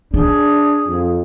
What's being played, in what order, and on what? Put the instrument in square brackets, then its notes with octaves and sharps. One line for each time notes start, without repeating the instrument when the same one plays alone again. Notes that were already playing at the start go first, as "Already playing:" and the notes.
[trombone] D4 [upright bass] D#4 [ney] G#4
[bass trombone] F2